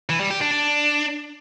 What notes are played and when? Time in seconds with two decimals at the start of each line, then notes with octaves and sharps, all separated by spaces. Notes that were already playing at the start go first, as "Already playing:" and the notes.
0.09 E3
0.20 G3
0.31 G4
0.41 D4
0.52 D4